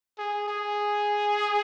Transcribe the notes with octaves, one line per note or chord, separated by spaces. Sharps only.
G#4
G#4